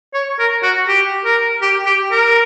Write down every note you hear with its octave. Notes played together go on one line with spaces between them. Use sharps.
C#5
A#4
F#4
G4
A#4
G4
G4
A#4